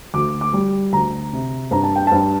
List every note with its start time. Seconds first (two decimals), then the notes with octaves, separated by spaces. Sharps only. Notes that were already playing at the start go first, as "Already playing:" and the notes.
0.14 D2 D6
0.41 D6
0.53 G3
0.93 D2 A#5
1.33 C3
1.71 G2 A#5
1.84 A5
1.96 G5
2.07 G2 A5